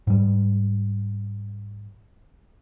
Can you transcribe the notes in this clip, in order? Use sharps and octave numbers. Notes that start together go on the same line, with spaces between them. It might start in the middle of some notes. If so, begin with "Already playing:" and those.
G#2 G3